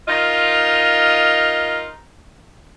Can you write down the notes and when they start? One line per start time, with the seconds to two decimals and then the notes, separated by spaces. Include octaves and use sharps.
0.08 D#4 F4 A#4 D#5